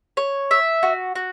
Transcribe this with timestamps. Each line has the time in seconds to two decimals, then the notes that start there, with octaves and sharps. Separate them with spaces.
0.17 C#5
0.51 E5
0.83 F#4
1.15 F#4